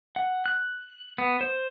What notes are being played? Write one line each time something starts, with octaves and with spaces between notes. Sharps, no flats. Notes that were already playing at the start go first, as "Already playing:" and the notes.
F#5
F#6
B3
C5